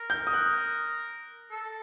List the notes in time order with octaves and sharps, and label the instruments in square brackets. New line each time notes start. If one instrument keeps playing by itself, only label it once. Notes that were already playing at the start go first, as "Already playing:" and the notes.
Already playing: [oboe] A#4
[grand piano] G6
D#6
F#6
[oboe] A4